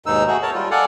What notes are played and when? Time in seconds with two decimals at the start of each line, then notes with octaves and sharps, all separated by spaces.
0.06 D#2 G#2 B2 D#4 E6
0.28 A3 F#4 G#4
0.42 A#4 C#5 A5
0.54 G3 F4
0.71 A4 D5 F5 F#5 G#5